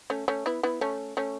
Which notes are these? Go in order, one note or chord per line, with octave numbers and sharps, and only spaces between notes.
A3 C#4
A3 C#4
B3 E4
B3 E4
A3 C#4
A3 C#4